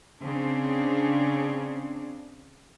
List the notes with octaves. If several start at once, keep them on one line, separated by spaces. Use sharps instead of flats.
C#3 C4 D4